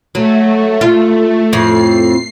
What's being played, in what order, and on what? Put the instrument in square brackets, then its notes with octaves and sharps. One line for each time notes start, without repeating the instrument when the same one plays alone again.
[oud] F#3 [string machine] A3
[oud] F4
[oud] F2 A2 [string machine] C7